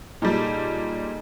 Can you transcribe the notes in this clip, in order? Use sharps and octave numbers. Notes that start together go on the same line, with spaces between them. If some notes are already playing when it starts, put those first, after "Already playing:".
A#2 G3 D#4 G#4 A4